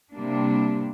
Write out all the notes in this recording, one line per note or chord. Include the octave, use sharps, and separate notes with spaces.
C3 G3 A#3 D4